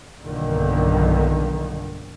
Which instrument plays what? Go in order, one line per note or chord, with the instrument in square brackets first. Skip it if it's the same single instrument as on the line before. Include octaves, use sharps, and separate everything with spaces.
[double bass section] B1 G2 A#2 D3 D#3